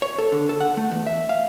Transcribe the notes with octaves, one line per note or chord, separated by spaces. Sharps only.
C#5
A4
D3
A4
F#5
A3
E2
E5
F5